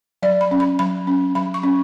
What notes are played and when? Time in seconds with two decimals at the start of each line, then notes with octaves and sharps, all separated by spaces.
0.22 F#3 D5
0.41 B5
0.51 C#4
0.60 B5
0.79 F#3 B5
1.07 C#4
1.35 F#3 B5
1.54 C#6
1.63 C#4